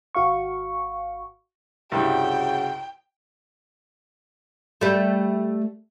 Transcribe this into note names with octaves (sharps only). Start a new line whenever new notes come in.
G#1 F#4 F5 C#6
C2 G2 C#3 F#4 G5
G3 A3